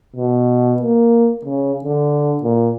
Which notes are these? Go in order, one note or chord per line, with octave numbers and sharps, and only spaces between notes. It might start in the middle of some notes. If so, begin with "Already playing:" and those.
B2
A#3
C#3
D3
A#2